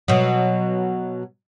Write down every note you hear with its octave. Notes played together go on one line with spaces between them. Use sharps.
B2 F#3